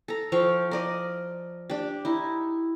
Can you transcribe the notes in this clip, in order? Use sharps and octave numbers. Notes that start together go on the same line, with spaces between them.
A4 A#5
F3 F5 G5 C#6
A#4 D5 D#5
D4 G4
D#4 E4